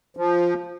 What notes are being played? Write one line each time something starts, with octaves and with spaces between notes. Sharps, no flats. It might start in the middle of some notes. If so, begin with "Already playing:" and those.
F3